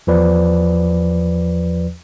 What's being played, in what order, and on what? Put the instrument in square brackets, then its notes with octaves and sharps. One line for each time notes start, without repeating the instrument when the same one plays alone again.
[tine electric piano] E2 F3 B4 D5